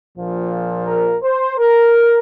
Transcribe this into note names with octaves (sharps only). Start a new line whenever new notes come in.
A#1 A#2 F3
A#4
C5
A#4